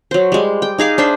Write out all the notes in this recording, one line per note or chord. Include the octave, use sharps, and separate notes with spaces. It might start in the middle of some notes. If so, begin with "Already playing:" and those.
F#3 C5
G3 G#3
G5
D#4 G#4 F5 D6
D4 C5 E5 C6